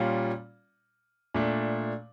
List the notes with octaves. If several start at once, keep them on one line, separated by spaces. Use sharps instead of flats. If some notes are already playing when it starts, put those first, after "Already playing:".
Already playing: A#2 G3 C#4 F4
A#2 A3 D4